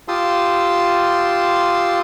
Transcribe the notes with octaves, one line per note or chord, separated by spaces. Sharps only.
F4 G4 A5 C6 D#6 E6